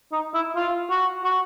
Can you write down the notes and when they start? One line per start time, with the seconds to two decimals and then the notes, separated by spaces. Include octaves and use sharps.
0.12 D#4
0.34 E4
0.56 F4
0.90 F#4
1.25 F#4